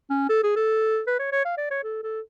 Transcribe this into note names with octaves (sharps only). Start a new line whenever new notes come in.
C#4
A4
G#4
A4
B4
C#5
C#5
F5
D5
C#5
A4
A4